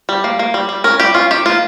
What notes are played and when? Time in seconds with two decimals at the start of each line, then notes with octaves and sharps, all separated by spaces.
0.09 G3
0.24 A#3
0.39 A#3
0.54 G3
0.69 G3
0.84 C#4 A#4
1.00 G3 G4
1.14 C#4 F4
1.31 D#3 G4
1.46 A#3 F4